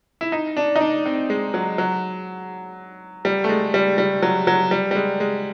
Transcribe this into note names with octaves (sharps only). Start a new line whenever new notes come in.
E4
D#4
D4
D#4
D4
C4
G#3
F#3
F#3
G3
A3
G#3
G3
G3
F#3
F#3
G3
G3
G#3
G#3